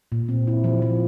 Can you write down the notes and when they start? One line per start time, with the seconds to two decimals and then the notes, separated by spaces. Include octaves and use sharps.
0.12 A#2
0.29 C4
0.47 E4
0.64 F3
0.82 F3